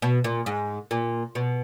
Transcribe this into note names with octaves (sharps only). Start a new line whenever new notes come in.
B2
A#2
G#2
A#2
B2